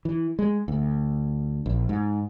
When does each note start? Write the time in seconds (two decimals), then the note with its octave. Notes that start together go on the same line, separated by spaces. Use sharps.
0.05 E3
0.39 G#3
0.68 D2
1.66 A#1
1.89 G#2